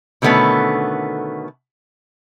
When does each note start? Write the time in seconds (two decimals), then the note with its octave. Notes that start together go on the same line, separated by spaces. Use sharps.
0.22 B2 D3 D#3 A3 B3 C#4